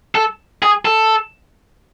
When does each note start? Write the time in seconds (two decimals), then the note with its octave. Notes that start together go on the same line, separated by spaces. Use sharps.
0.15 A4
0.63 G#4
0.85 A4